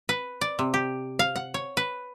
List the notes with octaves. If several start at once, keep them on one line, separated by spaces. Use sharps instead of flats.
B4
D5
C3
G4
F5
F#5
C#5
B4